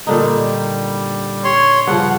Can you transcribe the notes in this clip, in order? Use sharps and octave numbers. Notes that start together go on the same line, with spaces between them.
A#2 D3 G3 D#4
C#5 C6
G2 C#3 F3 F#5